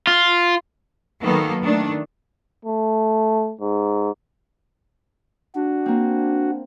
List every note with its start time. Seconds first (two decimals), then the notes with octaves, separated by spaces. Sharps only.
0.07 F4
1.22 D#3 F#3 A#3 B3 A4
1.62 D#3 A3 D4
2.65 A3
3.61 G#2
5.55 D4 F#4
5.86 A#3 C4